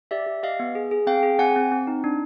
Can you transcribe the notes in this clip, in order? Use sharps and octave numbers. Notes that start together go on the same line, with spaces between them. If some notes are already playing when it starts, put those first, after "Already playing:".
G4 D5 E5
G4
G4 D#5 F5
B3
G#4
G#4
C4 F5 G5
G#4
C4 F#5 G#5
C4
C4
D#4
D4